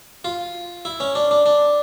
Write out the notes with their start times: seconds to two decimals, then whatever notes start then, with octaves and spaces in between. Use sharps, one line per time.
0.25 F4
0.85 E4
1.00 C#4
1.15 D4
1.31 D4
1.46 D4